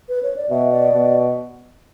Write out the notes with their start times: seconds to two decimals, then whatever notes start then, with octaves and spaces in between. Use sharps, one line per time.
0.09 B4
0.23 C#5
0.36 D5
0.50 B2 E5
0.72 D5
0.93 B2